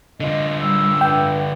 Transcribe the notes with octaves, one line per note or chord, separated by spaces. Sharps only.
D3 F4 D#5
G3 E6
G2 G5